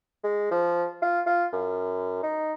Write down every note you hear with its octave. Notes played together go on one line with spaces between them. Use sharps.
G#3
F3
F4
F4
F#2
D#4